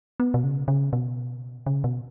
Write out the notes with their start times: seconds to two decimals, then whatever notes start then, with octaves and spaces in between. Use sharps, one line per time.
0.20 B3
0.34 B2
0.44 C#3
0.68 C#3
0.93 B2
1.66 C#3
1.84 B2